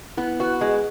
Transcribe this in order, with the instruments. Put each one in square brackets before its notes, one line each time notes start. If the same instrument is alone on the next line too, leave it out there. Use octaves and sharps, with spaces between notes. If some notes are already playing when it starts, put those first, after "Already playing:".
[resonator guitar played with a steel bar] B3 [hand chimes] E4
[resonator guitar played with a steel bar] F#4 [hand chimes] B4
[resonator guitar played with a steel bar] G#3 [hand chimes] G#4